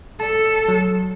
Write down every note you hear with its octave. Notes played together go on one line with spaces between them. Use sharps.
A4 D5 A5
F#3